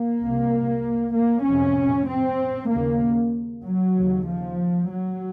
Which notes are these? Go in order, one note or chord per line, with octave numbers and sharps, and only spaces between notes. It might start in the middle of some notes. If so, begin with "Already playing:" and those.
Already playing: A#3
C2 C3
A#3
F2 C3 C#4
C4
D#2 C#3 A#3
F#3
D#2 C#3
F3
F#3